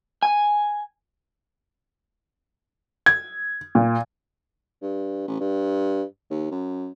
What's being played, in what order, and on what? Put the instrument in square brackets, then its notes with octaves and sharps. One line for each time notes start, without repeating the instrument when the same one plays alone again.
[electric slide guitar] G#5
[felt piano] G#6
A#2
[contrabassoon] G2
A1
G2
D#2
F#2